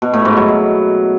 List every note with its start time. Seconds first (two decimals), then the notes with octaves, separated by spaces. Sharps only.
0.02 B2
0.14 A2
0.25 G#2
0.37 F#3
0.48 B2